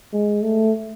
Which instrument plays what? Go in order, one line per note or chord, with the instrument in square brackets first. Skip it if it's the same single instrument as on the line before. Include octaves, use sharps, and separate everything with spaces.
[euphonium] G#3
A3